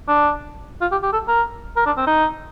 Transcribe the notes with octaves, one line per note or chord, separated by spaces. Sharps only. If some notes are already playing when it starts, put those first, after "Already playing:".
D4
F4
G4
G4
A4
A#4
A#4
D4
C4
D#4